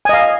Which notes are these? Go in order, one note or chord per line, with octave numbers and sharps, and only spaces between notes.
D#5 F5 G#5